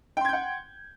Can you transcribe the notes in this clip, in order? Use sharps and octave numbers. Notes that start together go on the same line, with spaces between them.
F#5 G5 C6 G6 G#6